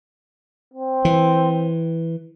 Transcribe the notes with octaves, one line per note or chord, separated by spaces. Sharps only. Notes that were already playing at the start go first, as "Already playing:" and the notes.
C4
E3